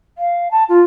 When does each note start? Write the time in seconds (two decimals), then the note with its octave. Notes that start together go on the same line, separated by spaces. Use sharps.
0.18 F5
0.51 A5
0.69 F4